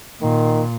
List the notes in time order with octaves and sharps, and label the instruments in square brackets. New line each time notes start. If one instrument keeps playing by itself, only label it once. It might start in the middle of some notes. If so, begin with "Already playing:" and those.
[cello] A#2 [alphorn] D#3